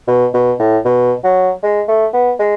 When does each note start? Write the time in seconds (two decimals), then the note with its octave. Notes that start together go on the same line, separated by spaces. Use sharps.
0.07 B2
0.34 B2
0.59 A2
0.85 B2
1.24 F#3
1.63 G#3
1.88 A3
2.13 B3
2.39 G#3